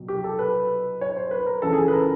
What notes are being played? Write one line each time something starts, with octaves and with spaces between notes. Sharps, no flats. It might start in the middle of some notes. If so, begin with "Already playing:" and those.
Already playing: C2 B2 F#3
G4
A4
B4
C#5
C5
B4
A#4
C#2 C#3 E3 A4
G#4
A4
B4
A#4